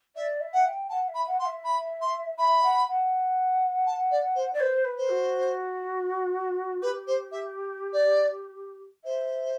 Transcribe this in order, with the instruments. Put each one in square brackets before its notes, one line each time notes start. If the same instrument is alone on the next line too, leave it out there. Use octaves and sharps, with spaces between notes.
[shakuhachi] D5 [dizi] E5
[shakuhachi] E5
[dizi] F#5
[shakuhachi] G5
[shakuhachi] F#5 [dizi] A5
[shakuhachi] E5
[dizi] B5
[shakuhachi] F#5
[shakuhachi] F#5 [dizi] C6
[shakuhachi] E5
[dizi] B5
C6
[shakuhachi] E5 [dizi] B5
[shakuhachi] F#5
F#5
[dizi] A5
D5
C5
[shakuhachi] D5
[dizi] B4 [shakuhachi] C5
[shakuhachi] B4
[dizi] C5
[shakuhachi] F#4
[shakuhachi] G4 [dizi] B4
[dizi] C5
E5
D5
[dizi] C5 [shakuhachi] E5